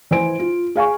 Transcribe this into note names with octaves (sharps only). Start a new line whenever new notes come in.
E3 C5 G#5 D7
F4
G#4 F5 G#5 C#6